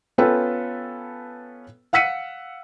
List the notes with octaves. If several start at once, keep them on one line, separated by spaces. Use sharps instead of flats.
B3 C#4 F4 A4 B4 G5
F5 F#5 E6 B6 C#7 D#7